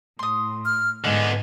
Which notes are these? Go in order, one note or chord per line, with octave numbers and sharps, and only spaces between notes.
A2 C6 D#6
F6
G#2 D3 B3 D#5 F#5 G#5